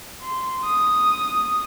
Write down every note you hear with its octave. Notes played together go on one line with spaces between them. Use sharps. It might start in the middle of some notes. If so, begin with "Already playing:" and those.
C6
D#6